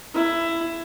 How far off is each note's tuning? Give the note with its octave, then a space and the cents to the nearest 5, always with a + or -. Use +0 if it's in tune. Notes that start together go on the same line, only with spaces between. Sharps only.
E4 +15